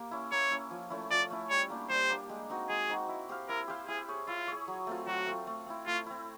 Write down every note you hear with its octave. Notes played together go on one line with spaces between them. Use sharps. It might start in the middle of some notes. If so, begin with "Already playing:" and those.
Already playing: A#3 G4
C#4 E4
A#3 C#5
C#4 E4
F3
A3 C#4 E4
F3 D5
A3 C#4 E4
G3 C#5
A#3 D4 G4
G3 C5
A#3 D4 G4
G#3
C4 D#4 F#4
G#3 G#4
C4 D#4 F#4
E4
G4 C5 F5
E4 A#4
G4 C5 F5
E4 G#4
G#4 C#5
E4 F4
G#4 C#5
F#3
A3 C4 F4
F#3 F#4
A3 C4 F4
A3
C4 E4
A3 F4
C4 E4